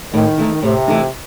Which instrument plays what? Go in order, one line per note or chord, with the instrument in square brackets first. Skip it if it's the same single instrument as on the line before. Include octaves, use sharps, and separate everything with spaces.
[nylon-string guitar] A2 [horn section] D#3
[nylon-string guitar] E3 A3 D#4
[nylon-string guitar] A2 [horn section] C3
[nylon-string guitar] E3 A3 D#4